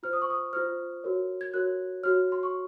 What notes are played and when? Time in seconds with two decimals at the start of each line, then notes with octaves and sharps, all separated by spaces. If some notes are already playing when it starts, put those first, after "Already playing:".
0.03 F4 C5 F6
0.13 D#6
0.22 C#6
0.30 D#6
0.53 F4 C5 F6
1.04 F#4 A#4 C#5
1.41 G#6
1.54 F#4 A#4 C#5 F#6
2.03 F#4 C#5 F6
2.32 C6
2.43 C#6